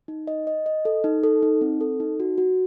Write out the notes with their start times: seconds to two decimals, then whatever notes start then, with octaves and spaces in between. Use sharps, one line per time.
0.08 D#4
0.27 D#5
0.47 D#5
0.66 D#5
0.85 A4
1.04 D#4
1.24 A4
1.43 D#4
1.61 C4
1.81 A4
2.00 D#4
2.20 F#4
2.38 F#4